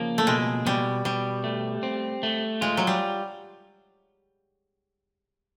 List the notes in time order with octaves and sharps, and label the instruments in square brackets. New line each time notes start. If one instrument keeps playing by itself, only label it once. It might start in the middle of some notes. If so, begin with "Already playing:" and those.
Already playing: [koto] C#3 F3 [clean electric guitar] A#3
[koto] A3
[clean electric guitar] B2 [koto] G#3
[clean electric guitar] B2 [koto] G3
[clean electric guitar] B2 [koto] G3
[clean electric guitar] A3
C4
A3
[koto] G#3 [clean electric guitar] F4
[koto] F#3
G3